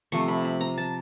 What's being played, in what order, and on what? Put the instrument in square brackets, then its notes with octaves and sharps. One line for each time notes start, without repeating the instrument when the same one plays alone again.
[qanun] C3 F3 A3 C#6
B5
B5
A#5
A5